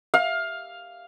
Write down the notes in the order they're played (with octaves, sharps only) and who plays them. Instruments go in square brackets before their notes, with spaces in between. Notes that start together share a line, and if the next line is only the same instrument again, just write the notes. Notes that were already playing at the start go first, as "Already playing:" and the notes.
[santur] F5